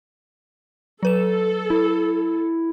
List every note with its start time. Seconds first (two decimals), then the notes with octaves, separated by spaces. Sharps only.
1.03 F#3 A4 B4 E7
1.70 E4